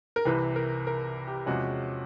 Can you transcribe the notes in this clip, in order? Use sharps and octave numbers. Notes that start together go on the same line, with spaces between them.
A#4
C2 C3 E3 B4
A#4
A#4
G4
E2 C3 F3 G#3 C#4 F#4